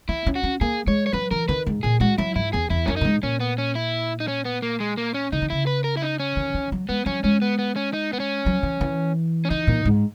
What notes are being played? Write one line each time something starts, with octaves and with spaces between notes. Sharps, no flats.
B3 E4
C#4
F#4
C#4
A#3 G#4
G#3 C#5
C#5
F#3 B4
E3 A#4
D#3 B4
G#2
A#2 G#4
G#3 F#4
F#3 E4
G#2 E4
E2 G#4
E2 E4
F#2 C#4
A#2 D#4
G#2
A#2 C#4
B3
C#4
E4
D#4
C#4
B3
A#3
G#3
A#3
C#4
C#3 D#4
D#3
C#3 E4
B4
A#4
E4
D#4
C#4
D#3
D#3
F#3
G#3 B3
F#3 C#4
G#3 C#4
B3
B3
C#4
D#4
B3
C#4
F#3
E3
E3
C#4
E3 D#4
A#2
G#2